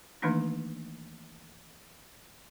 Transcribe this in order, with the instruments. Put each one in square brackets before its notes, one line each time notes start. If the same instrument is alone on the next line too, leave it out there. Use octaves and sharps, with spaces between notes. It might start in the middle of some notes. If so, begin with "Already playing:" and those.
[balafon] D#3 E3 A3 A#3 D4 D#4